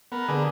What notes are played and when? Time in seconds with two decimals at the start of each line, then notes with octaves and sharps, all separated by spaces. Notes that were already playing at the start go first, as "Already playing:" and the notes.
0.12 B3 A#4
0.28 D3 G#4